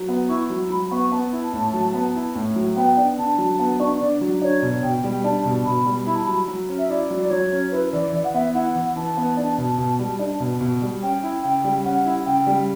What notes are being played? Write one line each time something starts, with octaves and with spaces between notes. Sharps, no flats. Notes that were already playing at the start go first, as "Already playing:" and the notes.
Already playing: F#3
B3
E4 C#6
F#3
F#3 B5
B3 C#6
B3 A5
E4
A2
F#3
B3
E4
A2
F#3
B3 G5
D4
D3 A5
F#3
B3 A5
D4 C#6
D3 D5
F#3
D4 C#5
B2
B2 G5
G3
D4 A5
B2
B2 B5
G3
E4 B5
A5
F#3 B5
F#3
C#4
E5
E4 D5
F#3
D5
F#3 C#5
C#4
E4 B4
E3 D5
E3 D5
F#5
B3 E5
E4 F#5
E3
E3 A5
B3
D4
B2
B2
G3
D4
B2
B2
G3
C#4 G5
E4
C#3 G5
G3
C#4 F#5
E4
C#3 G5
G3